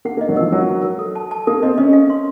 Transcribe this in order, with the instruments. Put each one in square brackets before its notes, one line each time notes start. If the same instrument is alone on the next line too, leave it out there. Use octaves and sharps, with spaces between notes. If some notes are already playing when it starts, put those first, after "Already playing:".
[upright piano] A#3 [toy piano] F#5
[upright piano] A#3
[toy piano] D#5
[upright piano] F#3
[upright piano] F3 [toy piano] A#4
[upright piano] F#3 [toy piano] A#4
[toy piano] A#4
A#4
A4
A5
A5
[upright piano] A#3 [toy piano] A4
[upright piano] C4 [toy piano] D#5
[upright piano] C#4 [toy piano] D#5
[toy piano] F5
C6